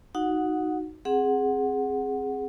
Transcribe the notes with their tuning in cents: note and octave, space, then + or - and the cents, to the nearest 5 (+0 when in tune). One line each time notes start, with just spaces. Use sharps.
D#4 +0 F#4 +0 F#5 -15
C4 +15 G#4 +0 F#5 +0